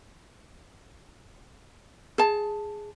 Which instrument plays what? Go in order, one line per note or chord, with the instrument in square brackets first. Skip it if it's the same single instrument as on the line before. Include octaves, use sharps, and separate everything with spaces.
[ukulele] G#4 A5